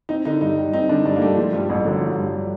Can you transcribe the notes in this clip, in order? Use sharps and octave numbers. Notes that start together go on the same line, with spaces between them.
C4 D#4
D3 D#4
G2 D#4
G3
C4 D#4
D3 D4
G2 D4
A#3
G3 A3
F3 G#3
G2 G3
A1 G3
D3 F#3
F3
G2